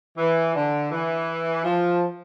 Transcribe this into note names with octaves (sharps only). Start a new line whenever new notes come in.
E3
D3
E3
F3